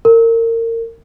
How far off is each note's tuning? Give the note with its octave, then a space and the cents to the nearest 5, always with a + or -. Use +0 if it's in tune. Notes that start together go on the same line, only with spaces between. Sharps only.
A#4 -30